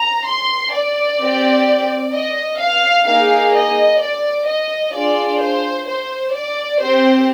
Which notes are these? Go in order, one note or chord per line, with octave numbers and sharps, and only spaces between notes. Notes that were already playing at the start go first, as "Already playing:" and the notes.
Already playing: A#5
C6
D5
C4 G4
D#5
F5
A#3 D#4 G#4 F5
D#5
D5
D#5
D4 F4 G#4 D5
C5
C5
D5
C4 G4 C5